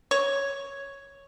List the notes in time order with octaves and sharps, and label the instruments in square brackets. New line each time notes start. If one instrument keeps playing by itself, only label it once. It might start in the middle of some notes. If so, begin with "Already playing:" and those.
[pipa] C#5